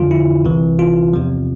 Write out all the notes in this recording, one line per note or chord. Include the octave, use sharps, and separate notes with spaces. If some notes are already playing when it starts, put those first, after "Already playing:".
Already playing: F2 D3 F3 F4
E4
C2 C3 E3
F4
E2 C3 F3